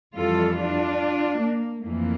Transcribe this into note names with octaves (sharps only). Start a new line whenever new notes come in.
F2 E3 G3 F4 A4
D4 F4
A#3
F2 E3 A3 A#3